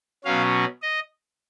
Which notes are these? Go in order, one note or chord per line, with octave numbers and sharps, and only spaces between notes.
B2 F#3 C#4 F5
D#5